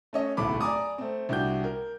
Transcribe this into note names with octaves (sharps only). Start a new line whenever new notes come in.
A3 C#4 D#5
D1 B1 A2 A3 B5 D6
D5 G#5 A#5 D6 D#6
A3 C4
C2 D4 F#4 G4 G6
A#4